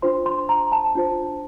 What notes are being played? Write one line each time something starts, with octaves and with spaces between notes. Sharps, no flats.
D4 F4 C5 C6
C6
A#5
A5
D4 F4 C5